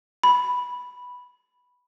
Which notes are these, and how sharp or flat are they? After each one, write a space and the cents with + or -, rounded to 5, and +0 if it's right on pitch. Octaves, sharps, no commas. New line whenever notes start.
B5 +0